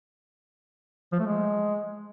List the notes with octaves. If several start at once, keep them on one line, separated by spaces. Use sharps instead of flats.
F3
A3
G#3